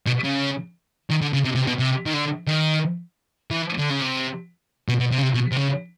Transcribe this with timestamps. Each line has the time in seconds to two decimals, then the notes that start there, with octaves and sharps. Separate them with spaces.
0.06 B2
0.24 C#3
1.10 D#3
1.21 D3
1.33 C#3
1.45 C3
1.55 C3
1.67 B2
1.79 C3
2.06 D#3
2.13 D3
2.47 D#3
3.51 E3
3.78 D3
3.90 C#3
4.02 C3
4.88 B2
5.00 B2
5.11 C3
5.18 C#3
5.22 C3
5.34 B2
5.52 C3
5.57 C#3